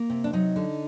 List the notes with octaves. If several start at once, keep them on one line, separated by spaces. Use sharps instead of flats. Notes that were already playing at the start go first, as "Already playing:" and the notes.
Already playing: A#3
C3
D4
F#3 D#4
D3